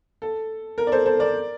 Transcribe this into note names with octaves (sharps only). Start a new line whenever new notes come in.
A4
A#4
D5
A4 C5
A4 C5
A#4 D5